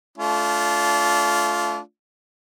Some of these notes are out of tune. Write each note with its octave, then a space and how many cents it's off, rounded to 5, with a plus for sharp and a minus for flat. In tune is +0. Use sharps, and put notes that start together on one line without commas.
A3 -25 D4 -35 F4 +0